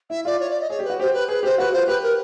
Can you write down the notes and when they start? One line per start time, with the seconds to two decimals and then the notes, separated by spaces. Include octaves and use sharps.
0.10 E4 E5
0.25 F4 D5
0.40 C#5
0.50 D5
0.60 D#5
0.70 G#4 C#5
0.79 G4
0.84 B4
0.90 F#4
0.99 G4 C5
1.13 B4
1.29 G#4 B4
1.43 G4 C5
1.58 F#4 B4
1.73 F4 C5
1.87 G4 B4
2.03 A#4